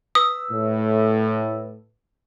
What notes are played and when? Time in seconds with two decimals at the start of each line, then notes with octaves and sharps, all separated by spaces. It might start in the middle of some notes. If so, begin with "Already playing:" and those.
0.15 B4 D#6 E6
0.51 A2